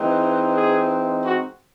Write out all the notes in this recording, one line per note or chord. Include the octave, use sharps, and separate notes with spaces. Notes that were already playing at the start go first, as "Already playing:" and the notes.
Already playing: E3 G#3 C4 D#4
G#4
F#4